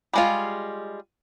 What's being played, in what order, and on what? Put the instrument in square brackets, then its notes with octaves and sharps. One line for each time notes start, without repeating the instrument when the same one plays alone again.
[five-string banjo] G3 G#3 F4